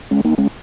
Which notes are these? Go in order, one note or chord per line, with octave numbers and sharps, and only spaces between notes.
G#3 C#4
A#3 D#4
G#3 C#4